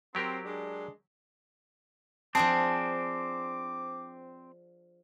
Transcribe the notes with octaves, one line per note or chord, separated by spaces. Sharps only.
F#3 C4 G4 A#4
G#3 D4
F3 C4 D4 G#4 A5 D6